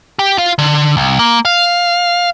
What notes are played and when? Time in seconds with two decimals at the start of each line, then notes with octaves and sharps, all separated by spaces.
0.19 G4
0.38 F4
0.58 D3
0.97 C2
1.19 A#3
1.45 F5